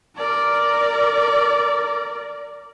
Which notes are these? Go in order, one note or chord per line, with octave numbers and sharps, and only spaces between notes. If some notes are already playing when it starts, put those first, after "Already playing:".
A#4 D5